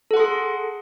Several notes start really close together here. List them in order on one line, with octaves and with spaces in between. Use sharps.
A4 F#5 C6 G#4